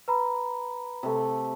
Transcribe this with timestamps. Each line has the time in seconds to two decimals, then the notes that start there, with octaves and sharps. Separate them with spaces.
0.08 B4 A#5 B5
1.03 C3 A3